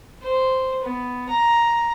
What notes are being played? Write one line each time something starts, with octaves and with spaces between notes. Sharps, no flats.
C5
B3
A#5